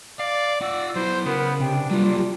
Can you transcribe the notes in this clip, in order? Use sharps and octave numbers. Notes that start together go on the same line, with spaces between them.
D5 F5
F4 D5 F#5 E6
F#3 B3 E4 C5
C#3 B3 A#4
C3 D4 G5
F#3 G3 A#3 F4